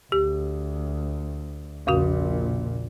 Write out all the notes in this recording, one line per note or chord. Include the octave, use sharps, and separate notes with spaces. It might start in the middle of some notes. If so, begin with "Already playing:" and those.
D2 G4
A#1 E2 A#2 C#3 F#4